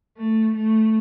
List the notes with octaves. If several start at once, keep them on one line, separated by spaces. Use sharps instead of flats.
A3
A3